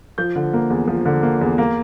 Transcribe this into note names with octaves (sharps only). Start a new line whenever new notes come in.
F3 G6
D3
A#3
E2
F3
D3
A#3
E2
A#3